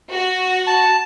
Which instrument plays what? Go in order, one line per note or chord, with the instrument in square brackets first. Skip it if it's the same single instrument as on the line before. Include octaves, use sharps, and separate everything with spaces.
[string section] F#4
[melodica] A5